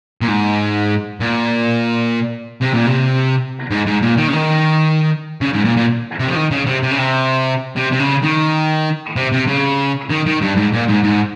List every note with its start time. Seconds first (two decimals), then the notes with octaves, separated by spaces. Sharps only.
0.22 A#2
0.28 G#2
1.20 A#2
2.61 C3
2.74 A#2
2.87 C3
3.71 G#2
3.87 G#2
4.02 A#2
4.17 D#3
4.28 C#3
4.33 D#3
5.41 C#3
5.53 G#2
5.65 A#2
5.77 A#2
6.19 C3
6.27 F3
6.35 D#3
6.51 C#3
6.66 C3
6.83 C3
6.91 C#3
6.98 C3
7.76 C3
7.92 C3
7.99 C#3
8.22 D#3
9.16 C3
9.32 C3
9.47 C#3
10.10 D#3
10.26 D#3
10.41 G2
10.56 G#2
10.72 A#2
10.87 G#2
11.03 G#2